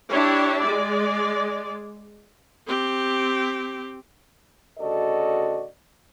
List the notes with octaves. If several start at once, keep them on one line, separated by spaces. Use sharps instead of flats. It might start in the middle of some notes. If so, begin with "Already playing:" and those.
D4 E4 G4 C#5
G#3 D5
C4 G4
D2 C#3 F#4 A4 D5 D#5